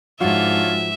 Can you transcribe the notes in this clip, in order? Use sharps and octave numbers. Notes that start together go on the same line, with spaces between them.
G#2 F3 D4 F4 F#4 C#5 E5